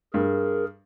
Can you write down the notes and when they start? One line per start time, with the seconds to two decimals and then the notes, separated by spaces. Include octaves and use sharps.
0.14 G2 G#4 A#4